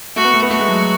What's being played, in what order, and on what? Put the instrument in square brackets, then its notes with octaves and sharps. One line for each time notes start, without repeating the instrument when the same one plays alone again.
[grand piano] A3 [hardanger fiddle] F#4
[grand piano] B3
A3
B3
[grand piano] A3 [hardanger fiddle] F#4
[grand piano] G#3
F#3